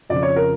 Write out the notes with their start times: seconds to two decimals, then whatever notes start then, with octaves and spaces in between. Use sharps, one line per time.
0.10 F2 C#3 F3 D5
0.23 C#5
0.36 A#4